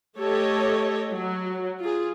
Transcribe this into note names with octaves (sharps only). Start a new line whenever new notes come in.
A3 G4 A4 C#5 D#5
F#3
F4 G#4